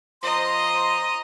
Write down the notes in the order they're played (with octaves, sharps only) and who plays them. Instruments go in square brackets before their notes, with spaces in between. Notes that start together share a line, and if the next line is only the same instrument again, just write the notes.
[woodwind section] F3 C5 C6 [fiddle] D#5 A#5